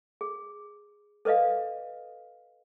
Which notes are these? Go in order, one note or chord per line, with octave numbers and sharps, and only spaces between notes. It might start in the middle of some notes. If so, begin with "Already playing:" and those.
G#4
A4 B4 D5 D#5 F5